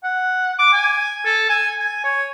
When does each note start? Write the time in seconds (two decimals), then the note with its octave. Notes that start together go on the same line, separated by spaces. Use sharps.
0.03 F#5
0.59 D6
0.73 G#5
1.25 A4
1.49 G#5
1.79 G#5
2.04 C#5